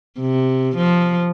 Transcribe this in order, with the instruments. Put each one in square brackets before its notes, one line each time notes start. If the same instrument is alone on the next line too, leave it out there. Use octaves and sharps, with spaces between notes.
[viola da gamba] C3
F3